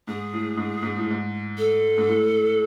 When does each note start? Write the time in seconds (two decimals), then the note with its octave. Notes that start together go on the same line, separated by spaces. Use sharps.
0.07 G#2 G#4
0.33 A2
0.57 G#2
0.83 G#2
0.97 A2
1.11 G#2
1.58 A4
1.98 G#2
2.08 A2